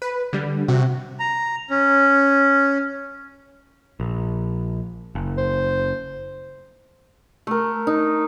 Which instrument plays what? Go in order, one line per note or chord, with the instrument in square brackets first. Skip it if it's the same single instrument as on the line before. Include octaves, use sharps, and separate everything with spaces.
[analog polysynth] B4
D3 G3
[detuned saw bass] C3 [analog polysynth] F#4
[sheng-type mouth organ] A#5
C#4
[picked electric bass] A#1
F#1
[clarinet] C5
[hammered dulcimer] A3 A#4
D#4